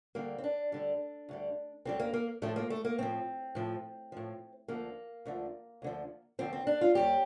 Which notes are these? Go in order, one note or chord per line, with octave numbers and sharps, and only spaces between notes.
D2 D3 G3 A#3
C4
D4
D2 D3 G3
D2 D3 G3
D2 D3 G3 C4
A#3
A#3
A2 F3 A3
A#3
A3
A#3
A2 F3 C4
A2 F3
A2 F3
D2 D3 F3 A#3
D2 D3 F3
D2 D3 F3
D2 D3 F3 C4
C4
D4
F4
D#2 D#3 G3 G4